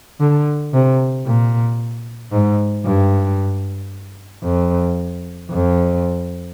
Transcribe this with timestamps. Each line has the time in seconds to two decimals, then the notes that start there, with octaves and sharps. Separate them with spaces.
0.20 D3
0.73 C3
1.26 A#2
2.32 G#2
2.85 G2
4.44 F2
5.50 F2